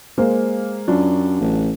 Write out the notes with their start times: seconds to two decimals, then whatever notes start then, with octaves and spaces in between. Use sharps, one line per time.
0.18 G#3 A#3 C5
0.87 F#2 F#3 D4 F4
1.41 A1